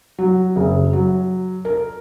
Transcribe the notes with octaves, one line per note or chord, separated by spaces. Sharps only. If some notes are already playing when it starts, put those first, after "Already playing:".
F#3
F#1
F#3
A#4